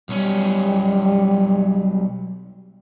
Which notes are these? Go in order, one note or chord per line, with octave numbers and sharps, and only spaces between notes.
B1 G3 C#4